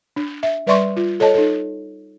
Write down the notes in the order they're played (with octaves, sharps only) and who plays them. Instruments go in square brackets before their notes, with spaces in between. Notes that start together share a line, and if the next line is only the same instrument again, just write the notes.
[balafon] D4
E5
G3 B4 D5 E5 C6 C#6
F4
A4 C#5 D#5 A5
D#4 A4